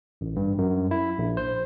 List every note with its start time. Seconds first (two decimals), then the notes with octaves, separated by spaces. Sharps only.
0.21 A1
0.36 G2
0.58 F#2
0.91 E4
1.18 A#1
1.37 C5